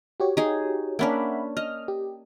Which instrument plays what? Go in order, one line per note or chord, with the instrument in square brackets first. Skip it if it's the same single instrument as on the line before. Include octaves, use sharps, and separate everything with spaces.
[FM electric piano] F#4 G4 C#5
[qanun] D#4 G#4
[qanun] A#3 C#4 D4 [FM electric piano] E5 F#5 B5
[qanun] D#5 [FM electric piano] F6
[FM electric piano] G4